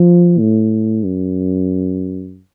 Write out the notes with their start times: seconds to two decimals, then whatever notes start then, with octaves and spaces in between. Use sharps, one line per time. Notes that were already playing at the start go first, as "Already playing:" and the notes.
Already playing: F3
0.39 A2
1.05 F#2